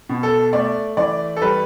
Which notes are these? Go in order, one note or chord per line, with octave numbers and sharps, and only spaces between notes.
B2
A4
A3 D5
E3 D5
A4
G3 B4